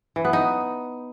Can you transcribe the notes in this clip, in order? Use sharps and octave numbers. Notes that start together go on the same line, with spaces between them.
E3
B3
D#4